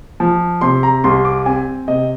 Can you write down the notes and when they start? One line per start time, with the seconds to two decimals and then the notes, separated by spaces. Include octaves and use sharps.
0.20 F3
0.61 C3 C6
0.83 A#5
1.04 C2 C6
1.25 D6
1.46 C4 G#5
1.88 C3 D#5